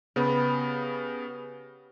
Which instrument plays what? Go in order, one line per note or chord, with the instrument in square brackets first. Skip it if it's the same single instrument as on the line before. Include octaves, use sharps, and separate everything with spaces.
[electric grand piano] C#3 B3 [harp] G4 B4 B5